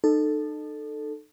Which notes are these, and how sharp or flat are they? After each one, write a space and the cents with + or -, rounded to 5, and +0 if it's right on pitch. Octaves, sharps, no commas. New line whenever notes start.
D#4 -35 A4 +0